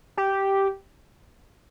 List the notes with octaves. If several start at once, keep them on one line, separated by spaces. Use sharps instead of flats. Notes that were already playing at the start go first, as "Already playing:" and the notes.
G4